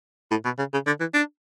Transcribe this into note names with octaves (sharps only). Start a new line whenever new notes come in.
A2
B2
C#3
C#3
D3
E3
D4